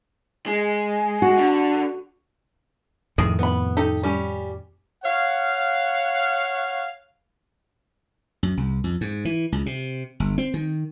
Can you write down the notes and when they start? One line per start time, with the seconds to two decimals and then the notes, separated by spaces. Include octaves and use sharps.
0.46 G#3
1.22 F#4
1.38 D3
3.18 F2 A2 D#3 G#4
3.39 B3 B5
3.77 D#4 G4 A4
4.03 G3 C#4
5.04 C#5 F5 F#5
8.43 F#2
8.57 C2
8.84 F2
9.01 G#2
9.25 E3
9.52 C#2
9.66 C3
10.20 G1
10.38 C4
10.54 D#3